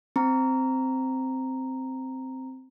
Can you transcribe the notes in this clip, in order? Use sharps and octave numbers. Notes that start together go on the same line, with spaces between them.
C4 A#5